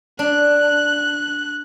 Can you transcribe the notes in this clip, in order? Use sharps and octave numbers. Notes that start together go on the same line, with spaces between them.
D4 F#6